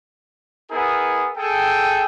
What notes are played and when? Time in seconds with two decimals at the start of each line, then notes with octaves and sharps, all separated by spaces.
0.70 B3 E4 G#4 A#4
1.37 G#4 A4 G5